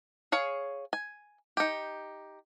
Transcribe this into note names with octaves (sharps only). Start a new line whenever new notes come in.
G#4 C#5 F5
G#5
D#4 G4